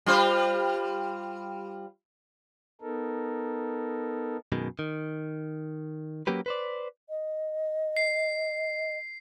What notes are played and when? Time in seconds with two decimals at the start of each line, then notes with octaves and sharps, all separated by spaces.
0.06 G3 F4 C5
2.82 B3 D#4 A4 A#4
4.52 F#2 B2 D#3 G#3
4.79 D#3
6.27 F#3 A#3 C#4 G4 B4
6.46 B4 C5 D5
7.09 D#5
7.97 C7